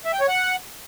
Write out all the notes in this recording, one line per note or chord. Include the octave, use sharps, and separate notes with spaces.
E5
G5
C#5
F#5